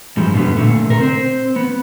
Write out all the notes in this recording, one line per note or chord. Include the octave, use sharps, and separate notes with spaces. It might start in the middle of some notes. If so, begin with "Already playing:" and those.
G#2 F3 G3
F#2 B2 D3 G3 B3
A#2 D3 A3
C3 A#4
C4 C5
B3